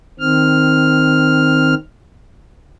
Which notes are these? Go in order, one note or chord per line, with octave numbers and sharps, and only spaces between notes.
D#3 C4 F6